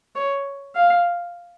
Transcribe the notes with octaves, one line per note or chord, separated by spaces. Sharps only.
C#5
F5